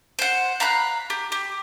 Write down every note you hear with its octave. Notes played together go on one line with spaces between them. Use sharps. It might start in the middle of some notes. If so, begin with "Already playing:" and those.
C5 F#5
F5 A#5 B5 F#6
G4
G4